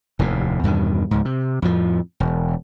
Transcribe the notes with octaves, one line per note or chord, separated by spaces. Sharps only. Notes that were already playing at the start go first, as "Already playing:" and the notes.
F1 D#2 A2
E2 G2 B2 D#3
C#2 G#2
C3
F2 A2 F3
E1